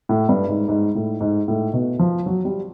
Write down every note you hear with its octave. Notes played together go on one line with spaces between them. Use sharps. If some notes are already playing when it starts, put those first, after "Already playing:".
A2
G2
G#2
G#2
A2
G#2
A2
B2
F3
F#3
G3